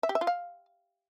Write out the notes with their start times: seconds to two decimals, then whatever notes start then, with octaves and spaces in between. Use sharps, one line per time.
0.03 E5
0.09 G4
0.15 E5
0.21 F4
0.27 F5